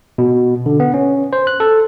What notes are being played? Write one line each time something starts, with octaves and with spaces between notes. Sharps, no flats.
B2
D3
B3
C#4
C5
F#6
A4